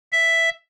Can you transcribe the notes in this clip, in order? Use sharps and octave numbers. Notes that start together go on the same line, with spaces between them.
E5